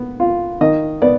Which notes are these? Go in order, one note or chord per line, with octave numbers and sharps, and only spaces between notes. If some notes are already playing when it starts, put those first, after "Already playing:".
Already playing: B3
F4
D#3 D#5
B3 D5